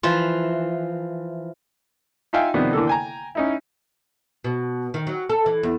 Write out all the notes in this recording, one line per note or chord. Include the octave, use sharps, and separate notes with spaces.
E3 F3 F4
D#4 F4 E5 F5 G5 G#5
C3 D#3 F3 B3 D4
D3 E3 A#3 A4
G5 G#5 A#5
C#4 D#4 E4
B2
D#3
F#3
A4
E3
E2